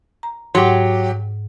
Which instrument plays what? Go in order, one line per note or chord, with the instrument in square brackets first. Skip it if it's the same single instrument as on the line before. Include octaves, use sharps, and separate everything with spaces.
[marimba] A#5
[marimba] G#2 F#5 [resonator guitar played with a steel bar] F#3 G4